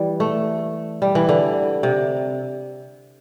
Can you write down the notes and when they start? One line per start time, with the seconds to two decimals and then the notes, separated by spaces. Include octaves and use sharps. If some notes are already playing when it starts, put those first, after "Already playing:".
Already playing: E3 G3
0.20 A3
1.02 G3
1.15 E3
1.29 D3
1.83 C3